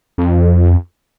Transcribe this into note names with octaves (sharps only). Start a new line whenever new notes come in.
F2